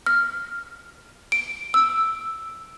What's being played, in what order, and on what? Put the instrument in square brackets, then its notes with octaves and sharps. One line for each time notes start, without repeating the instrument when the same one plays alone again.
[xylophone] F6
D7
E6